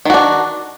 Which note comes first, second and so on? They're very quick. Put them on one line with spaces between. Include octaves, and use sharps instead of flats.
D#3 F#4 D4